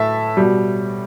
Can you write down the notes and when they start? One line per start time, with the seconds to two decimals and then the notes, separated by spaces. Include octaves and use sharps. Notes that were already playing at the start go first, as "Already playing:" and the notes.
Already playing: A2 A3 E5 A5
0.37 B2 G3